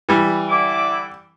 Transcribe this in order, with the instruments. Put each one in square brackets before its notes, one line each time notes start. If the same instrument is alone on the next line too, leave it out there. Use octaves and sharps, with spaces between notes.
[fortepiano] E3 G3
[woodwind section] D3 E4 D6